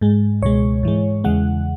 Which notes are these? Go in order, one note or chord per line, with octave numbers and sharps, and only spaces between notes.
G#2 G#3
C#2 B2 G#3 C#5
G#2 E3 G#3
E2 C#3 E3 G#3 F#5